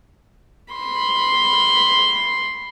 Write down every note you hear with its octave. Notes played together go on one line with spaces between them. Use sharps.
B5 C6